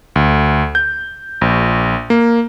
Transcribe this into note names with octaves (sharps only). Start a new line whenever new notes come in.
D2
G6
A#1
A#3